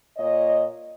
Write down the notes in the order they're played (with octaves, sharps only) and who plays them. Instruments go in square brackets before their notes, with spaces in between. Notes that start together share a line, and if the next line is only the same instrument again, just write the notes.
[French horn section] A#2 C#5 D#5